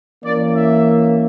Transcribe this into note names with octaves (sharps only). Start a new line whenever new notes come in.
E3 A#3 C#4 D5
E5